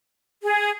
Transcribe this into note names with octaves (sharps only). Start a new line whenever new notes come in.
G#4